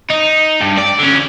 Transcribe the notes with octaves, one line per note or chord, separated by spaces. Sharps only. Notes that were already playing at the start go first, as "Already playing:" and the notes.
D#4
G2
D5
D3 C#4